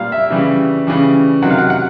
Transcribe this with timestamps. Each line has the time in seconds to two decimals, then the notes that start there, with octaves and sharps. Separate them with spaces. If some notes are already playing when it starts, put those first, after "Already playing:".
Already playing: A#2 G3 F5
0.12 E5
0.30 C#3 E3 G3
0.87 C#3 E3 G3
1.42 C3 D#3 F#3 F#5
1.50 F5
1.59 F#5
1.70 F#5